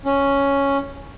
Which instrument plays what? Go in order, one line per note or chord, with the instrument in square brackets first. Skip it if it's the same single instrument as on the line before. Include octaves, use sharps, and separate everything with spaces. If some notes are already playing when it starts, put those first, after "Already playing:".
[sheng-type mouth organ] C#4